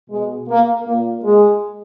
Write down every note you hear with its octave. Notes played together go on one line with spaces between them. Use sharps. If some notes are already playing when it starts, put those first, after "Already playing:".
B2 G#3
A#3
A#2 A#3
G#3